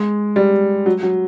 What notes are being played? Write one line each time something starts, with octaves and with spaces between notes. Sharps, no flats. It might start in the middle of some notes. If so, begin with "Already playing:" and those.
Already playing: G#3
G3
F#3
F#3